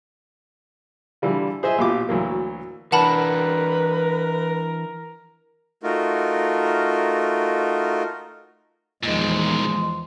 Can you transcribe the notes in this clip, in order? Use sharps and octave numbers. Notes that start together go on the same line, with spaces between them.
D3 E3 G3 F4
G#4 C5 D#5 E5 G#5
A#1 B2 F4 G4 D6
D2 E3 F#3 A#3
E3 D4 A#4 B4 F#5 A5 B5
A3 D#4 F4 F#4 A#4
E2 A#2 D#3 F3 G#3